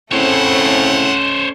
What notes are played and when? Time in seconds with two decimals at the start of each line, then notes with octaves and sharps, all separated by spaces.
0.12 A2 C#3 A3 C4 C#4 C5 C#5 F#5